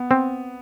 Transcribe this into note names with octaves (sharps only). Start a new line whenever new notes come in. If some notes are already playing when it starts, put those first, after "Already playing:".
Already playing: B3
C4